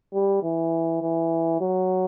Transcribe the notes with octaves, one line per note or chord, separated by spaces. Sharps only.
G3
E3
E3
F#3